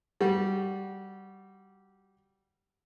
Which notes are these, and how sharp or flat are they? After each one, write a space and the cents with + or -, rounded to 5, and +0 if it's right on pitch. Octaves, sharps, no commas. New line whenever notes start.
G3 -15 F#4 +0